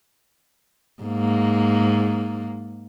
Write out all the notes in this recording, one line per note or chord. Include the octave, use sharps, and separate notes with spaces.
G#2 A#3